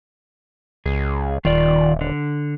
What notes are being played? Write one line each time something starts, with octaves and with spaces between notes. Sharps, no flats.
C#2 G#4
D#1 D#3 F4 D5
D3